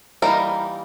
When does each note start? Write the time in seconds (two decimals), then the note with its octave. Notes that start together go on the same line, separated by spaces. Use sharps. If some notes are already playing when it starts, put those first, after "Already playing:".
0.22 E3 G3 A#3 D#4 A#4